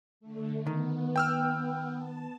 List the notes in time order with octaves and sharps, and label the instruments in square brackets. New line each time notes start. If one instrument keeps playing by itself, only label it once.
[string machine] D3 A3
[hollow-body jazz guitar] D#3 [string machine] B3
[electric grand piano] G5 E6 F6
[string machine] A5